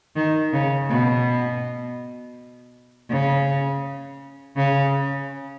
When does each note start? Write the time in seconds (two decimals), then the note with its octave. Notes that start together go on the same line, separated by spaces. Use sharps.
0.16 D#3
0.53 C#3
0.90 B2
3.10 C#3
4.56 C#3